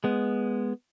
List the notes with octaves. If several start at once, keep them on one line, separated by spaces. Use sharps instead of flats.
G#3 B3